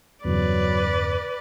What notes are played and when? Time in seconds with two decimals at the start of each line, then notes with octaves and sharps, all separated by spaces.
0.25 E2 G2 C#3 F#3 B4 D5